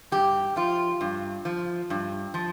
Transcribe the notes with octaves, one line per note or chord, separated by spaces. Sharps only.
G2 G4
F3 F4
G2
F3
G2
F3